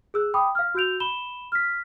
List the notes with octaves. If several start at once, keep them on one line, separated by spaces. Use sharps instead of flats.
G#4 E6 F#6
G5 B5 D6 D#6
F5 F6
F#4 E6 G6 D7 F7
B5 E7 G7
F6 B6